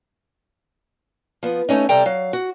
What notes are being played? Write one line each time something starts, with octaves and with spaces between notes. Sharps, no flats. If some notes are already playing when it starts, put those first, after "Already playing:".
F3 B3
A3 C#4 D#4
C3 G3 A4 G5 A#5
F#3 F5
F#4